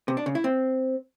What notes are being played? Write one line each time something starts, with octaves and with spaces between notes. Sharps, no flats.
C3
D4
C#3
E4
C4